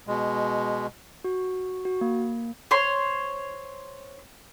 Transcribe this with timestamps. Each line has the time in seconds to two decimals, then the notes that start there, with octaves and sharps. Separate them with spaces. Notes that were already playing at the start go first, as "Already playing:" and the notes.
0.07 B2 G#3
1.24 F#4
1.85 F#4
2.01 A#3
2.71 C5 C#5 C6